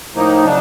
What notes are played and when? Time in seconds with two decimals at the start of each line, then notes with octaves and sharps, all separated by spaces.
0.14 A2 F3 A#3 D#4
0.45 C#3 F#3 D4